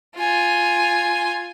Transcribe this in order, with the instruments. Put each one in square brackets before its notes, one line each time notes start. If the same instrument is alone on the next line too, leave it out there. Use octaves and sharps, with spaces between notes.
[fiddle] F4 G#5